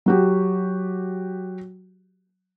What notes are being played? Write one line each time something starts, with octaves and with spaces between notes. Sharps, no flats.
F#3 F#4 G4